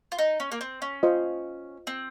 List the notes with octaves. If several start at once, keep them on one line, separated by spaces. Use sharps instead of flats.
F4
D#4
C#4
A#3
C4
C#4
F4 C5 D#5
C4